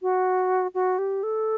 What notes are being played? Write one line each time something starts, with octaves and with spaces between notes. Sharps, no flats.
F#4
F#4
G4
A4